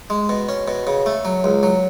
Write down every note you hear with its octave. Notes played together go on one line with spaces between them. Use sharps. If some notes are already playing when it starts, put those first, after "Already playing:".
G#3
B2
C#4
B2
C#3
A3
F#3
C#2
F#3